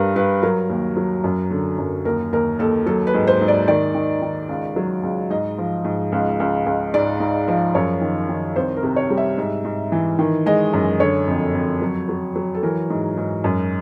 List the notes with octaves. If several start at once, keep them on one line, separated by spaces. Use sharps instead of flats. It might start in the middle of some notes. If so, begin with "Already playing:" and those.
Already playing: G2 G3 A#4 B4
G2 B4
F#3 A#4
D#2
F#3
F#2
D3
F#2
D#2 A#4
D#2 A#4
D#2 A4
F#3 A4
B4
G#2
C5
G#2
D5
D#3 D5
D#3
D#3
C#2
F#3
C#2
G#2 D#5
F3
G#2
C#2
C#2
C#2
G#2 D5
G#2
F3
F#2 C#5
D#3
D#3
C2 C5
A#4
C3
C#5
G3
E5
G#2
G#2
E3
D#3
G#3 D#5
F#2
D3 C#5
F2
F2
F#3
F#3
F#3
A4
E3 A#4
G#2
G#2
F#2